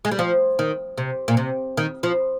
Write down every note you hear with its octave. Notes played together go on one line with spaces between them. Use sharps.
G#3
G3
F3
D#3
C3
A#2
C3
D#3
F3